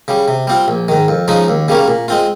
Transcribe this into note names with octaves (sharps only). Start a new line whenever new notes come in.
C#3 G3
C3
G3 C4 F4
A#1
G#2 D#3
F2
C#3 F3 G#3 D#4
D#2
C#3 G3 A#3 C#4
A#2
G#3 C4 F4